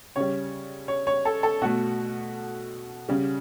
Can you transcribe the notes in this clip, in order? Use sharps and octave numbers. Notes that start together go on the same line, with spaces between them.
C#3 G3 C#5
C#5
C#5
A4
A4
B2 A3 F#4
C#3 G3